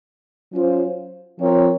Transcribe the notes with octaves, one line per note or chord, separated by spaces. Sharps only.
F#3 C#4 F4 C5
F3 C4 F4 A#4 C#5